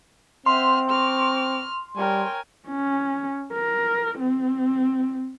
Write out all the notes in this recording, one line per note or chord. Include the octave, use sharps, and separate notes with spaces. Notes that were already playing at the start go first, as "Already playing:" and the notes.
C4 C5 E5 F#5 C6 F6
A#5 C#6 D6 F6
G3 A#4 C#5 G5 G#5
C#4
A#4
C4